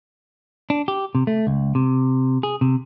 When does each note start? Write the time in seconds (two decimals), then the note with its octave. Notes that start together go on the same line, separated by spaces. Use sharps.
0.70 D4
0.88 G4
1.15 C3
1.27 A3
1.47 C#2
1.75 C3
2.43 G#4
2.61 C3